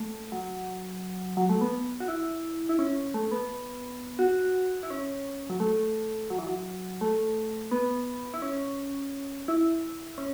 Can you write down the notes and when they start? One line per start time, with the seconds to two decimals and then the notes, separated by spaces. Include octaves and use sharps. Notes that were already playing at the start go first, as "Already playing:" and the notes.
Already playing: A3
0.32 F#3
1.37 F#3
1.49 A3
1.61 B3
2.00 F#4
2.08 E4
2.69 E4
2.79 C#4
3.14 A3
3.31 B3
4.19 F#4
4.83 E4
4.90 C#4
5.50 F#3
5.60 A3
6.30 F#3
6.38 E3
6.47 F#3
7.01 A3
7.71 B3
8.34 E4
8.42 C#4
9.48 E4
10.18 C#4